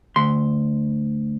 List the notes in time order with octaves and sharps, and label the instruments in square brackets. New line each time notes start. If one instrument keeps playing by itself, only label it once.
[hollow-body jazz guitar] D2 C6